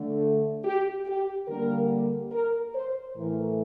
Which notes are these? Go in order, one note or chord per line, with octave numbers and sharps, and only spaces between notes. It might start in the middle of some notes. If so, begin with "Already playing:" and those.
Already playing: D3 A3
G4
G4
D3 G3 A#3 A#4
A#4
C5
A2 E3 A3 A#4